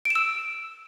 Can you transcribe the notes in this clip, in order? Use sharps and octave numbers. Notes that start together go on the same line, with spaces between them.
D7
E7
E6